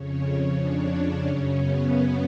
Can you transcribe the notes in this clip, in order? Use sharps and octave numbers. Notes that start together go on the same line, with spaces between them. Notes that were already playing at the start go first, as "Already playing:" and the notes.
Already playing: F2 C#3 C#4
D4
F#2 C#3 C#4
B3